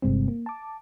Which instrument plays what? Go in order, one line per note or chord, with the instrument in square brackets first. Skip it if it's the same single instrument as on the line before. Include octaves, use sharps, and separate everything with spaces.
[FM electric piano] G1 G2 C3 G3 G#3 C4
A#3
A5 D6